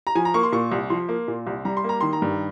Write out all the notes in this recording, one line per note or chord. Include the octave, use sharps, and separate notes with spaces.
A#5
F3 G#5
A#5
A#3 C#6
C6
A#2 C#6
C2
F3 C6
A#3
A#2
C2
G3 A#5
C6
A#3 A#5
D#3 C6
A#5
G2